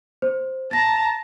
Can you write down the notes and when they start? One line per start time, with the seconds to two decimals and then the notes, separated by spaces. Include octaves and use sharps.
0.22 C5
0.71 A5 A#5 A6 A#6